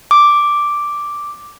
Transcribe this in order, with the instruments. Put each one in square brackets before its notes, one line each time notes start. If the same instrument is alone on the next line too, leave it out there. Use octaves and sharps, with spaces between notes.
[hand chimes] D6